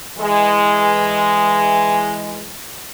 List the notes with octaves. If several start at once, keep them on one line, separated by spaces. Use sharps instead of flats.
E3 G#3